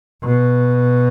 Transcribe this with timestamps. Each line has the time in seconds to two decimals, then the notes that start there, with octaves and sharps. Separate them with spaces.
0.23 B2